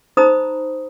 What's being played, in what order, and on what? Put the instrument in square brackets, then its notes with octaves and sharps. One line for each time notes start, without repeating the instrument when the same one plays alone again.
[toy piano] D#4 C5 A#5 B5 D#6